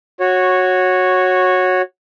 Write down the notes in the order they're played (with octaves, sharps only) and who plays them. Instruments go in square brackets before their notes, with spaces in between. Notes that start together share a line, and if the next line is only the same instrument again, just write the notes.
[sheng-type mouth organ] F#4 C#5